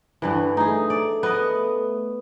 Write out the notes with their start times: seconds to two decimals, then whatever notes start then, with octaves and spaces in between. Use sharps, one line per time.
0.22 G2 D3 E3
0.57 A3 D#4 G#4
0.90 D5
1.23 B3 D#5